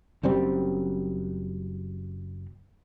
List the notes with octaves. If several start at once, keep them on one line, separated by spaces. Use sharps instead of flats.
F#1 F#2 G3 C4